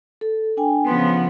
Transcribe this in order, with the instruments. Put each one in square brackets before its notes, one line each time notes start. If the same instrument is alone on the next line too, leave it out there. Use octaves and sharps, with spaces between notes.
[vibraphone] A4
D4 G5 G#5
[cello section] C#3 F3 B3 [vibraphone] F#5 C6